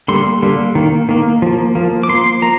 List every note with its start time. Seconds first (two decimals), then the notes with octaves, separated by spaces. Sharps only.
0.08 D3 G3 A#3 C6
0.42 D3 G3 A#3
0.75 D#3 A#3
1.09 D#3 A#3
1.42 F3 A#3
1.75 F3 A#3
2.03 D6
2.09 F3 A#3 C6
2.42 F3 A#3 A#5